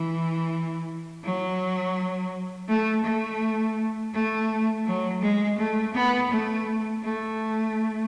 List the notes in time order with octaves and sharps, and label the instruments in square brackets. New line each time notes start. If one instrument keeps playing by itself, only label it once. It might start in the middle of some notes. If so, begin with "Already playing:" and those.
Already playing: [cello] E3
F#3
A3
A3
A3
F#3
G#3
A3
B3
A3
A3